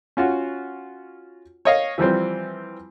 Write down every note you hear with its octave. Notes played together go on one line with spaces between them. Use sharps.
C#4 F4 F#4
C#5 D#5 F5
E3 F3 G3 C4